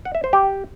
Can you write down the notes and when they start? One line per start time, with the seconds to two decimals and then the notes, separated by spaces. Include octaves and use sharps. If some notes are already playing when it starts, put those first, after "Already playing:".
0.05 F#5
0.15 E5
0.24 C5
0.33 G4